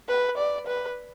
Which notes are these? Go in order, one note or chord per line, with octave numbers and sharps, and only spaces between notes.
B4
D5
B4